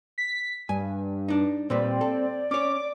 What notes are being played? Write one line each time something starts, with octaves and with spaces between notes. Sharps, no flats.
B6
G2 G#5
D4 D#4
A#2 G3 C4 B4 D5
A4
C#4 C#5 D6